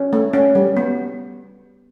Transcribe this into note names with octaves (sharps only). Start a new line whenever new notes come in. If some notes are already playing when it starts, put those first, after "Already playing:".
Already playing: C#4
A3
C#4
G3
B3